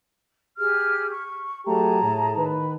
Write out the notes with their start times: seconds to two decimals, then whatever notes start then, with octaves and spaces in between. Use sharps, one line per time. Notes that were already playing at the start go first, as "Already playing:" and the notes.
0.58 G4 G#4 F6
1.11 C#6
1.66 F#3 A3 G4 G#4 A5 A#5
2.02 A2
2.37 D#3 B4